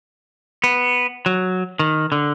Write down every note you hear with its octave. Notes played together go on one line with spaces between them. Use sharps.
B3
F#3
D#3
D3